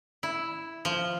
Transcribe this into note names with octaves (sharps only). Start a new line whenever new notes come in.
E4
F3